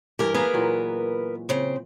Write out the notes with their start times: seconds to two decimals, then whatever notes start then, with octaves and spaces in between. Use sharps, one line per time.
0.19 G2 E3 G4 A#4
0.34 A#3 B3 G#4 A#4 B4
0.54 A#2 E3 F#3
1.49 C#3 C4